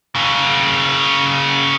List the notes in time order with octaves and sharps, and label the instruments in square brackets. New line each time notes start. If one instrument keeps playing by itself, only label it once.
[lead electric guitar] C#3 A#3